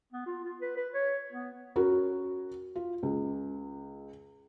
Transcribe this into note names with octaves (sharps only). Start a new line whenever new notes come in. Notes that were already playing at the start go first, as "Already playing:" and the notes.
B3
F4
F4
B4
B4
C#5
B3
C#4 F#4 A#4
F4
C#2